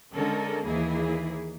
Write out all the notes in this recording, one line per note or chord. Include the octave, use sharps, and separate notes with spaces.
D3 G#3 C#4 A4 A#4
D#2 E3 A#3 E4 G#4